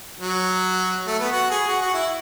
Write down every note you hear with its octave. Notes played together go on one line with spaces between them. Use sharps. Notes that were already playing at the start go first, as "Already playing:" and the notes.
F#3
A3
B3
F#4
G#4
F#4
F#4
E4